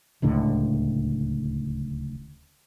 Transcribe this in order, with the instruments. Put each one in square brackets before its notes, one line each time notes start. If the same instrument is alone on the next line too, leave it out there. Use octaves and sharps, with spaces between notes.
[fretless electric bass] D1 C#2 A2 D3